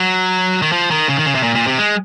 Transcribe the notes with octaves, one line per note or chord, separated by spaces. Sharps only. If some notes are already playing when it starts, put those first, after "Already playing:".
Already playing: F#3
D#3
F3
D#3
C#3
D#3
C#3
C3
A#2
A#2
C3
G#3